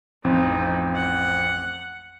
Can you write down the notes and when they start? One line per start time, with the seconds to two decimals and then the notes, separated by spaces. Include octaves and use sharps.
0.24 A1 F2 F3 C4 D#4
0.95 F#5